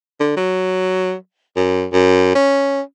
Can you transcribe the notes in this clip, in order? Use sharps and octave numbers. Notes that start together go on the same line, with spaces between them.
D3
F#3
F#2
F#2
C#4